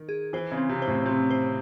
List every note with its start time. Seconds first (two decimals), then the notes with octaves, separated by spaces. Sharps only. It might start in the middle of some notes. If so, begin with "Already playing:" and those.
Already playing: D#3
0.09 G#4
0.33 E3 C5
0.52 C#3
0.57 C4
0.69 C3
0.82 C5
0.87 A2
1.06 C3 C4
1.31 C5